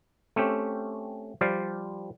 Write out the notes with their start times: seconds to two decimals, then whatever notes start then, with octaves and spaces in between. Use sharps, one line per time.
0.36 A3 C4 C#4 G4
1.41 F3 G3 C5 D5 F5